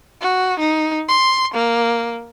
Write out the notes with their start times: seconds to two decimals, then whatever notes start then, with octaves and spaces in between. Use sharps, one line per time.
0.21 F#4
0.59 D#4
1.08 C6
1.54 A#3